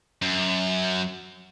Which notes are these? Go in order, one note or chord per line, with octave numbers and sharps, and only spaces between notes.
F#2